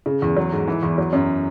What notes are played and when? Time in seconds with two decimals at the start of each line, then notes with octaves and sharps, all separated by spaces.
0.06 C#3
0.22 E2
0.37 F#3
0.52 G#2
0.67 E3
0.83 E2
0.98 F#3
1.13 F#2